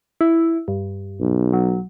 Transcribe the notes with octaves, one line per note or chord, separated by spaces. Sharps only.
E4
G2
B1
F#3